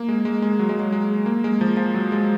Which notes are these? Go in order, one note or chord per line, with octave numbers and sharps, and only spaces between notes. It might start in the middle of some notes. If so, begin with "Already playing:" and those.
Already playing: A#3
G#3
G#3
G#3
F#3
G#3
F#3
G#3
A#3
G#3
F3
F3
F#3
G#3